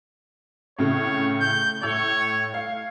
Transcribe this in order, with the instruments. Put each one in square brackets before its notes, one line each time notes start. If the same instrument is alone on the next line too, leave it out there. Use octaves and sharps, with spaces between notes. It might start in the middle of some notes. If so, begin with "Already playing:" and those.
[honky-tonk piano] A2 C#3 [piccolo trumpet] C#5
[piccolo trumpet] G6
[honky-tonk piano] A2 E6 [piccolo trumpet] C#5
[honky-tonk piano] F5